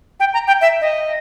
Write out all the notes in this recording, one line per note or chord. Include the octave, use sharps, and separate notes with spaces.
G5
A#5
G5
E5
D#5